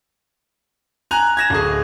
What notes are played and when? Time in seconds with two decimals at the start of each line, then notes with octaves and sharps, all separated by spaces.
1.11 G#5 A#5 F#6 F7
1.37 G#6 A#6 E7
1.50 D1 G#4